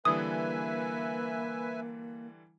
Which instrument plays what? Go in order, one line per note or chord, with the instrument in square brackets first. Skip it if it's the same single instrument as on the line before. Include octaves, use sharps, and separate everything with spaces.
[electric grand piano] D3 E3 G3 [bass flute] A#3 [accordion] B4 E5 G#5 [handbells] D#6